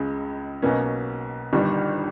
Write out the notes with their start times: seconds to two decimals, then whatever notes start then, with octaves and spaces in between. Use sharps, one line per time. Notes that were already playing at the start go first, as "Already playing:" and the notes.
Already playing: C#2 C#3 G#3
0.62 B1 B2 A#3 C#4
1.53 G1 G2 D#3 G3